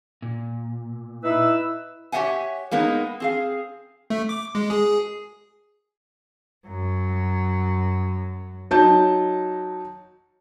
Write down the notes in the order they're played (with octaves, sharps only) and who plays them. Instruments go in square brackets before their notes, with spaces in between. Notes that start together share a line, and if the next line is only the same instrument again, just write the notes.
[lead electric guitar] A#2
[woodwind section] D#4 B4 E6 [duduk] E4
[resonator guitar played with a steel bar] G4 C#5 D#5 E5 F#5 G#5
G#3 A#3 B3 D#4
C4 G#4 F5
[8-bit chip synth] A3
D6
G#3
G#4
[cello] F#2 F#3
[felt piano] F#3 D#4 A5 G6